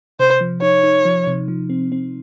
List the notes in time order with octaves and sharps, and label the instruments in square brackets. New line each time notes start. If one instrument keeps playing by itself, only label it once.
[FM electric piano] C3 [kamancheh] C5
[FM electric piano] F3
[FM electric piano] D#4 [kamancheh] C#5
[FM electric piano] D#4
F3
C3
F3
C4
C4